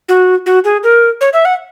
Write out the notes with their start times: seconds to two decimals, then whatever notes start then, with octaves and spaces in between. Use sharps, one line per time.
0.09 F#4
0.46 F#4
0.64 G#4
0.83 A#4
1.21 C#5
1.33 E5
1.45 F#5